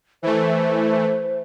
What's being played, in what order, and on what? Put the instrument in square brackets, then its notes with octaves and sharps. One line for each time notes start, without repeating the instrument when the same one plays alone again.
[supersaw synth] E3 A3 [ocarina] C5